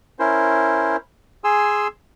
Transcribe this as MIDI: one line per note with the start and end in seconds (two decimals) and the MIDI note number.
0.19 0.96 61
0.19 0.96 64
0.19 0.96 70
0.19 0.96 72
1.44 1.87 68
1.44 1.87 80
1.44 1.87 84
1.44 1.87 88